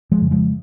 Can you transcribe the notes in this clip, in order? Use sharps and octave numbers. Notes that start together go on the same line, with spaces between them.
F3 G#3
F2 C#3
F3 G#3